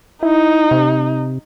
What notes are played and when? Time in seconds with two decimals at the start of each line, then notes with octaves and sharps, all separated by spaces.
0.23 D#4 E4
0.71 C3